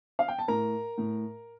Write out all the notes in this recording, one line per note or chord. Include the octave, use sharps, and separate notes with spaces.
F5
G5
A5
A2 A#4 A#5
A2